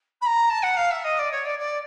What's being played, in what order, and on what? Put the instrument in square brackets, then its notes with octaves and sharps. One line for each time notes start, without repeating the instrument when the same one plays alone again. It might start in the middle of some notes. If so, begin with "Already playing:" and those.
[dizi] B5
A#5
A5
F#5
F5
E5
D#5
D5
C#5
D5
D5